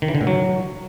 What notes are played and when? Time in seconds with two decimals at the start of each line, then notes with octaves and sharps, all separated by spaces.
0.02 D#3
0.08 E3
0.15 D3
0.21 A2
0.27 F#3